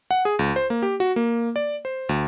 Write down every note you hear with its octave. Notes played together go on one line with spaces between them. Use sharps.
F#5
G#4
C#2
C5
A#3
G4
F#4
A#3
D5
C5
D2